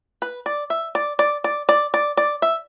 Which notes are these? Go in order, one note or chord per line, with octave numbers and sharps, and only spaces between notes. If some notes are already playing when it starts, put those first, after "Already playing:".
B4
D5
E5
D5
D5
D5
D5
D5
D5
E5